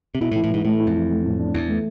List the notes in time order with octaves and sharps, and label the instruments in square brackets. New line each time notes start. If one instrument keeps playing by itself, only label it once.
[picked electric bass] C3
[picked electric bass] B2 [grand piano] E4
[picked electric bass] A2
[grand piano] E3
[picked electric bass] A2
[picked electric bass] G#2 [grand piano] E3
[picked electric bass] A2 [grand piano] A3
[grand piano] E4
[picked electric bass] F2
[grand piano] E3
A3
A2
D4
[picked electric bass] E2 [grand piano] E3
[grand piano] A3